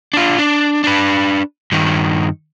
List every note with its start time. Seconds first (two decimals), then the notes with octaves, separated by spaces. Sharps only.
0.13 D4 F4
0.38 D4
0.84 D4 B4
1.72 G2 D#3